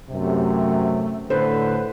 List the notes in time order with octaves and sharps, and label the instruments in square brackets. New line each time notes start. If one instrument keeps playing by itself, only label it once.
[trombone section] F#2 C3 [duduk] A3
[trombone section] A2 D3 [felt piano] A4 C5 [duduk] B4